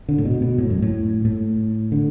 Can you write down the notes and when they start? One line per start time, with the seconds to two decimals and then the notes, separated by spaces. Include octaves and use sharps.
0.09 D3
0.18 A2
0.25 B2
0.42 B2
0.58 A2
0.70 F#2
0.82 A2
1.25 A2
1.92 D3